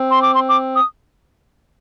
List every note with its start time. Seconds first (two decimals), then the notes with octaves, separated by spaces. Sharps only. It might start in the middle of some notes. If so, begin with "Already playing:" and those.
Already playing: C4
0.11 C6
0.22 D6
0.35 C6
0.49 D6
0.76 D#6